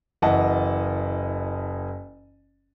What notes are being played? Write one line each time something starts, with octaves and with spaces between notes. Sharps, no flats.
F#1 E3 D#5 F#5 A5